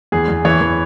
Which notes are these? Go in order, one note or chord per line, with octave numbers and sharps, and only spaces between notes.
E2 G#4
E2
E3 C#5
E3